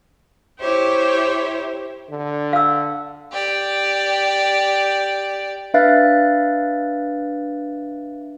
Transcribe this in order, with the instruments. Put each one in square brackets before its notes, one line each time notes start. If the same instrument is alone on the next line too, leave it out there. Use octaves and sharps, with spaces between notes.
[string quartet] E4 G4 C5 C#5
[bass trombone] D3
[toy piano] F5 E6
[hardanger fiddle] G4 D5
[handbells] D4 B4 E5 F5 F#6 A6